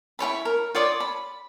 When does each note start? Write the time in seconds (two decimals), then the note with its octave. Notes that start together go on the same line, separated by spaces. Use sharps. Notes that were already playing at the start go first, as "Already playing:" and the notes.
0.19 E4 G4 C#5 B5
0.45 A#4
0.75 F4 C#5 D5 D#6
1.00 B5